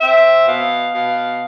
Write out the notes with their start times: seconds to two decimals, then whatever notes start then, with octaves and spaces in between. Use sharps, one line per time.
0.01 C4 E5
0.47 B2 F5
0.93 B2 F5